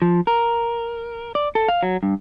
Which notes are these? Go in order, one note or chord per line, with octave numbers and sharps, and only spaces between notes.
F3
A#4
D5
A4
F5
F#3
G2